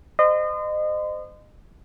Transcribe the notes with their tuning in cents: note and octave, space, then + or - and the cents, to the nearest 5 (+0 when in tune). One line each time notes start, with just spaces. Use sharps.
C5 -30 D#5 -30 C6 -35